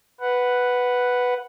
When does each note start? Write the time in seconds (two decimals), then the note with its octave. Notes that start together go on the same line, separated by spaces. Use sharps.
0.20 B4 F#5